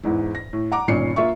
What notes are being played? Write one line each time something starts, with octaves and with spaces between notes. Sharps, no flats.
E2 G#2 E3
A#6
A2
F#5 A#5 D6
G1 A#2 D#3 C#4 C7 C#7
A#3 F4 E5 C#6